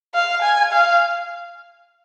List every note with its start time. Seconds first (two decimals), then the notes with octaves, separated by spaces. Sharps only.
0.14 F5
0.42 G#5
0.72 F5